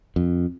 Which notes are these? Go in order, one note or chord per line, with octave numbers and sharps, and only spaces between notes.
F2